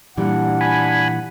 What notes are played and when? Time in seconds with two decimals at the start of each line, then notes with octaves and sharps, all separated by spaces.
0.17 A#2 E3 G3 D4 F#5
0.61 G#5 B5